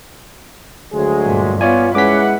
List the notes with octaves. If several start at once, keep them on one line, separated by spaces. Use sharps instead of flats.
D2 F#3 G#3 G#4
G2 A#2
B3 F4 C#5 D5 G#5
G#3 C#4 E4 B4 F#5 D6 B6